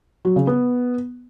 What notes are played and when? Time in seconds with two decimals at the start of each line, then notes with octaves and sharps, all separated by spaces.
0.25 F#3
0.36 C#3
0.47 B3